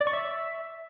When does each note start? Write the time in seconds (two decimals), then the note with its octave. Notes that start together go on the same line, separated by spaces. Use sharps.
0.01 D5
0.07 C#6
0.13 E5